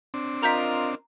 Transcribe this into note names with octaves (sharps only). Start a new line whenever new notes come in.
C4 D4
F4 A#4 D#5 A#5 G6 B6